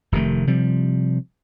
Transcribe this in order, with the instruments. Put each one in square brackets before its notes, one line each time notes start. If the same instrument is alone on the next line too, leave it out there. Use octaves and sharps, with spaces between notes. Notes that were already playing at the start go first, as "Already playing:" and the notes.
[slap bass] F1 C3 D#3 A3
C3 F3 G3